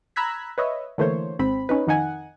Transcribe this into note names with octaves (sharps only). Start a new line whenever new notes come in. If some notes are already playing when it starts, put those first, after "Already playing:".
A#5 B5 E6 F#6 G#6 B6
B4 C#5 D#5 E5
D3 E3 A3 A#3 C5 C#5
G#1 G#2 C4 B5
C#4 D#4 B4
F2 D#3 D#4 F#5 G#5